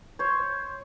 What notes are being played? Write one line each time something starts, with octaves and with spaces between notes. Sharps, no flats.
C5 C#5